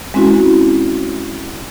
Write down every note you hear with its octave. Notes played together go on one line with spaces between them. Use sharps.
G#3 C4 C#4 E4 F#4